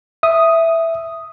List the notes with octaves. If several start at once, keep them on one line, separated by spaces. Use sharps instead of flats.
E5 D#6